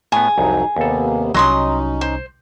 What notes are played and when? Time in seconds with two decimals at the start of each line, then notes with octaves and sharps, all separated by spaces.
0.12 A2 B3 G#4
0.38 C2 F2 F#3 D#4
0.76 D#2 C3 A#3 B3 A4
1.34 C2 F#3 C#4 D#4 D#5 C6 D#6
2.01 C5